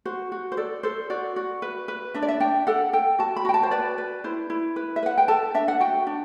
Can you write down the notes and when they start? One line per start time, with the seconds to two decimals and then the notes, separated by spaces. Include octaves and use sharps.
0.05 F#4 C5
0.32 F#4
0.52 C5
0.57 A4 D5
0.83 A4 C5
1.10 F#4 D5
1.36 F#4
1.62 B4
1.88 B4
2.14 D4 E5
2.22 D5
2.28 E5
2.40 D4 G5
2.67 A4 F#5
2.93 A4 G5
3.19 F#4 A5
3.36 B5
3.45 F#4 G5
3.54 A5
3.63 C5
3.71 B4 D5
3.98 B4
4.24 E4 C5
4.50 E4
4.76 B4
4.96 E5
5.03 B4 F#5
5.18 G5
5.28 A4 A5
5.54 D4 E5
5.68 F#5
5.80 F#4 G5
6.07 D4